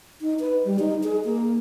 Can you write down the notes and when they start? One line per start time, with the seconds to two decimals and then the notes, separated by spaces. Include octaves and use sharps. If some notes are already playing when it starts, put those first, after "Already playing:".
0.21 D#4
0.40 B4
0.65 G3
0.79 D#4
1.03 G#4
1.25 A#3